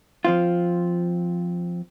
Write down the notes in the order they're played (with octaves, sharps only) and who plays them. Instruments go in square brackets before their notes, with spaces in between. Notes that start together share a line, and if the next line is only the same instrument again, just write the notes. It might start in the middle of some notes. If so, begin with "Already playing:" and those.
[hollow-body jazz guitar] F3 C4 F4